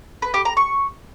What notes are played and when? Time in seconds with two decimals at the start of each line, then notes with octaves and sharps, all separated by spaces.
0.22 B4
0.34 G4
0.45 A#5
0.57 C#6